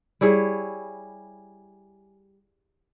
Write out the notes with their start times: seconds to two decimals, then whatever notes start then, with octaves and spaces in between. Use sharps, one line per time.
0.21 G3 E4 G#4 C#5